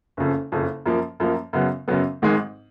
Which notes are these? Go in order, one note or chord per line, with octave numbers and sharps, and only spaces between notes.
F#1 F2 C#3
F#1 F2 C#3
F#2 F3 A#3
F#2 F3 A#3
F#2 C#3 F#3 B3
F#2 C#3 F#3 B3
G#1 G#2 D#3 G#3